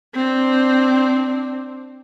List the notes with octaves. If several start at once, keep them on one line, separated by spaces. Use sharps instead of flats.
C4 D4